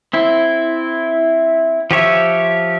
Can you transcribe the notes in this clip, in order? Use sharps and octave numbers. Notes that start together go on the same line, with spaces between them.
C4 E4
F3 G4 C#5 E5